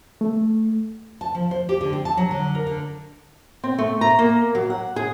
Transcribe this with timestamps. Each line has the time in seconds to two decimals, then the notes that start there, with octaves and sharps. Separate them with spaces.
0.21 A3
1.21 A5
1.35 F3
1.51 C5
1.69 G4
1.81 D3
1.93 C4
2.05 A5
2.17 F#3
2.31 D3
2.55 A#4
2.67 D3
3.64 C4
3.79 A3
4.01 A#5
4.19 A#3
4.55 F#3
4.70 F#5
4.96 G#4